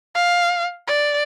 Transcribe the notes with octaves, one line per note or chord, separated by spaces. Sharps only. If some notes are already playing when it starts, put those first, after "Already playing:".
F5
D5